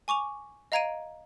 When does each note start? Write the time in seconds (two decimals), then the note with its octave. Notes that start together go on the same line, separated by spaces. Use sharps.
0.08 G#5 C#6 D6 F7
0.72 D#5 F5 A#5 G#6 D7 D#7